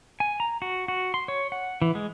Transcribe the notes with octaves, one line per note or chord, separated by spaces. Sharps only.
G#5
A#5
F#4
F#4
C6
C#5
F#5
E3
G#3